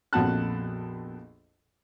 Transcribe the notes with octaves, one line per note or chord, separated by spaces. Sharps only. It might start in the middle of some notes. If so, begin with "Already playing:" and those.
A#1 F2 B2 F#5 A5 F#6